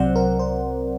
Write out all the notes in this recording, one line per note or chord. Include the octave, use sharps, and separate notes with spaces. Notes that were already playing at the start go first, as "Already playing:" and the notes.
Already playing: C2 C3 F#3 C4 C5 D5 F#5
A#4
C5